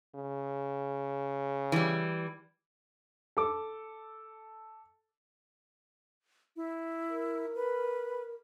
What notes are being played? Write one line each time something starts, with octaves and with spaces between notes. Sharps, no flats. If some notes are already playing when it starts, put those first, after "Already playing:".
C#3
E3 G3
A4 D6
E4
A#4
B4